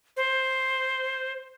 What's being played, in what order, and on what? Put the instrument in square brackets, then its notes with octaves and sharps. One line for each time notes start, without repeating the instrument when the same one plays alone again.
[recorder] C5